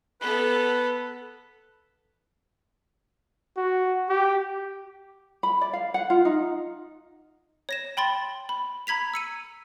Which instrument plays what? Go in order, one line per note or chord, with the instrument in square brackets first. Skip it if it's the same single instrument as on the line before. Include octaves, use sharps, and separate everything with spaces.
[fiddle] B3 A4 [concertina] B4
[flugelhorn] F#4
G4
[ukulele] B5
D5
F5
F#5
F4
D#4
[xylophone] C#5 A#6 E7
G5 B5 C6 A6
B5
A#5 B5 G#6 B6 F7
E6 C#7 D#7